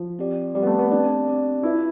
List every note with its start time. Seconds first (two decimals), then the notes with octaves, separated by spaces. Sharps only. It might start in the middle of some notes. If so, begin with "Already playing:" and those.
Already playing: F3
0.19 C4 G4 D5
0.55 G3 C4 G4 D5
0.62 B3
0.67 A3
0.79 B3
0.91 C4 D4 G4 D5
1.28 C4 G4 D5
1.63 E4 F4 B4 E5